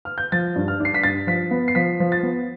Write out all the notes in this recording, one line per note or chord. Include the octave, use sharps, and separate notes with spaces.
F6
G6
F3 A6
G2
F6
D4
C7
B6
G2 A6
F3 B6
B3
C7
F3 B6
F3
A6
B3